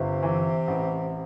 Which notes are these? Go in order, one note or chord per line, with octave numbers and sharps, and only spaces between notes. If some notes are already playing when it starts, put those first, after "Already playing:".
Already playing: G1 C3
E3
A1